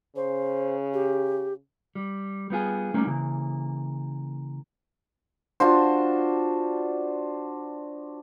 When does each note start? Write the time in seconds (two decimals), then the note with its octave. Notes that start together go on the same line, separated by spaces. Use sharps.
0.16 C#3 C5
0.94 G4
1.95 G3
2.50 G3 B3 F4 G#4
2.94 G3 A3 A#3 C#4 D#4
3.07 C#3 E3 A#3
5.60 D4 F4 F#4 C5